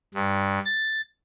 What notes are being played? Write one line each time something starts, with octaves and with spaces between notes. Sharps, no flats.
G2
A6